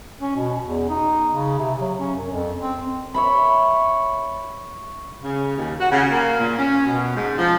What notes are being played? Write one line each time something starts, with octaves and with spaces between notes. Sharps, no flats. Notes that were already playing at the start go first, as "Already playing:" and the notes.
C#4
B2
E2
D#4
C#3
C3
F#3
C#4
F#2
F2
C4
C#5 E5 B5
C#3
D#2
F#4
C#3
A#3
A#2
C#4
B2
G#2
F3